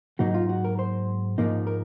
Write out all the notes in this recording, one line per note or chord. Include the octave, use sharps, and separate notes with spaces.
G#2 F#3 A#3 D#4 F#4
F4
F#4
A#4
C5
G#2 F3 A#3 D#4
A#4